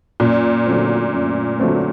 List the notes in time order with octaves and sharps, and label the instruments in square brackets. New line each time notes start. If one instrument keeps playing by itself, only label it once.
[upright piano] F#2 [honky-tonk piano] A#2
[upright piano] D3 F#3 A3 C4
F#2
D3 F#3 A3 C4